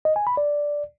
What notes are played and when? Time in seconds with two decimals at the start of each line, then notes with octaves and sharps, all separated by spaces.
0.05 D#5
0.16 G#5
0.27 B5
0.37 D5